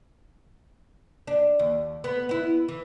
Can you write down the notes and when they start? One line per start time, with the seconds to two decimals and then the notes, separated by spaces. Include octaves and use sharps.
1.27 D4
1.59 D#2
2.04 B3
2.29 B3 E4
2.68 E3